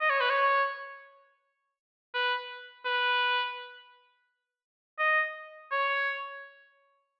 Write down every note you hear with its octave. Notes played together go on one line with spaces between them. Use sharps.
D#5
C#5
B4
C#5
B4
B4
D#5
C#5